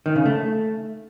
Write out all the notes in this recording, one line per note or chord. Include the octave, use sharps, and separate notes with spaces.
D#3
C#3
A3